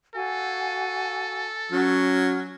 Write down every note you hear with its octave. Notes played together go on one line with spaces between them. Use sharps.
F#4 A4 F5 G#5
F#3 C#4 F#5 F6